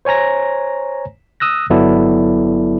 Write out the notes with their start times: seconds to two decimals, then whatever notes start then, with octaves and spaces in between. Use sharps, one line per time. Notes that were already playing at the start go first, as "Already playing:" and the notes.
0.05 C5 C#5 G#5 A#5 A#6
1.40 D#6 E6 F#6 A#6
1.70 G1 F#3 B3 E4 A4 D5